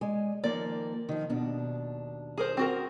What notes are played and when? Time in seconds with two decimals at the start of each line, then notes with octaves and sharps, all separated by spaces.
0.01 G#3 D5 G#5
0.44 D#3 F3 A#3 D5
1.09 D#3 F3
1.30 D#2 B2 D4
2.38 G#4 A#4 C5
2.57 C4 F#4 A#4